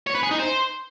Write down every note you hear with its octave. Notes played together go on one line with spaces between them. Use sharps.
C#5
B4
G#4
D#4
C5